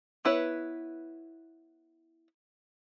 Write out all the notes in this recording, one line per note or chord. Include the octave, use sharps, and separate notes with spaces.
B3 E4 B4 C#5